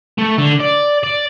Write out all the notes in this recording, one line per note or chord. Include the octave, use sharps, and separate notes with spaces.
A3
D3
D5
D5